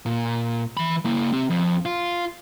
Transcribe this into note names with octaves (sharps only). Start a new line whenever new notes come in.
A#2
E3 B5
A#3 E4
C4 G4
F2
F4